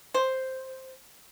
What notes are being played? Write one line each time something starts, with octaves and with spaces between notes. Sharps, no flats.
C5